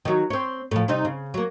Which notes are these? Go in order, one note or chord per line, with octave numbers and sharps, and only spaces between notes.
D#3 F#3
C4 C#5
A2 F3
C3 G3 D#4
C#3
F#3 A#3